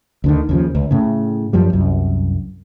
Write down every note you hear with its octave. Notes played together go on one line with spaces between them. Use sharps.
D2 D3 D#3
D#2 C#3 F3
C#2
A2 C#3
F#2 F3 G3
C2 F#2